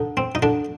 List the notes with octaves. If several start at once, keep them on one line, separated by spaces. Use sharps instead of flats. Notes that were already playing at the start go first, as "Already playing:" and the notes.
Already playing: D3 D#4
C4
D#4
D3 D4